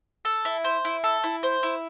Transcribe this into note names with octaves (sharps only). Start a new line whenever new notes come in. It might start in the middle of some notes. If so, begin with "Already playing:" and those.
A4
E4
C5
E4
A4
E4
C5
E4